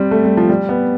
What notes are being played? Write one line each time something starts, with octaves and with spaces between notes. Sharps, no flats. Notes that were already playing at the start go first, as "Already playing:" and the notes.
Already playing: G3 C4
A3
G3
F3
G3
B3